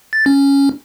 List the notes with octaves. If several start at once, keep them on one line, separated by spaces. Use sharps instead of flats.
A6
C#4